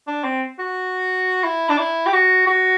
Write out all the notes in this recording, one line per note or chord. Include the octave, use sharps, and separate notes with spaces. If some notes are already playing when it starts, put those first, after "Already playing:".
D4
C4
F#4
E4
D4
E4
G4
F#4
F#4